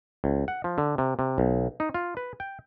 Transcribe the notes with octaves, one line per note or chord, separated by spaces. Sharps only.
C#2
F#5
F3
D3
C3
C3
B1
D#4
F4
B4
G5